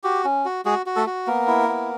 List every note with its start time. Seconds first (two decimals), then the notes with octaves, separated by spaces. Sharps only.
0.03 F#4 G4
0.25 C#4
0.45 F#4
0.65 G#3 F#4 G#4
0.86 F#4
0.96 A3 A4
1.07 F#4
1.27 A#3 B3 A#4
1.48 E4
1.68 B3